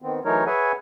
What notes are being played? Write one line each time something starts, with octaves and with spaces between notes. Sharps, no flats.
D#3 B3 C4
E3 F#3 A3 D#4 A#4 C#5
G#4 B4 C#5 E5 F#5 G#5